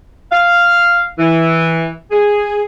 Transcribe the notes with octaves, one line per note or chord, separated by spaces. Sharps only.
F5
E3
G#4